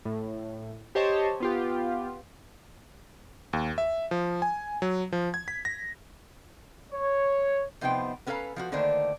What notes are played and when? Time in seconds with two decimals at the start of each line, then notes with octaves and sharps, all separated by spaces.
0.05 A2
0.95 G4 C5 C#5 D#5 A5
1.40 B3 F4 G4
3.53 D#2
3.78 E5
4.11 F3
4.42 G#5
4.82 F#3
5.12 F3
5.34 G#6
5.48 B6
5.65 A#6
6.92 C#5
7.81 C3 F3 B3 D#4 C5 G5
8.27 B3 C#4 A4 B4 F5 A#5
8.56 F3 F4 F#4
8.72 D3 D#3 A3 A#3 D4 C5